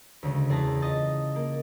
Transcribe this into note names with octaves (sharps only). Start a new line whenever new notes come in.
D2 C#3 G#3
E2 G#4 A5 A#5
F4 D#5 A6
A#3